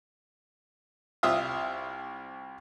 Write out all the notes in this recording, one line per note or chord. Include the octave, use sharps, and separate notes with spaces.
C2 F4 E5 D#6